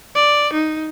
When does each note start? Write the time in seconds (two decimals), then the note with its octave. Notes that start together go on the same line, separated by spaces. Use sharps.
0.15 D5
0.53 D#4